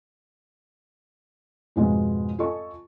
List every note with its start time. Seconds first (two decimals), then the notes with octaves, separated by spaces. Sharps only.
1.76 F2 G#2 B2 F3 G#3 B3
2.38 F4 A4 D#5 G#5 C#6